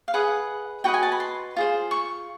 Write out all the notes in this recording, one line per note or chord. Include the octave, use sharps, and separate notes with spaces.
F5
G#4 B4 D#5 F#5
F#4 B4 D#5 G5
G#5
A5
B5
C6
F4 G#4 C5
C#6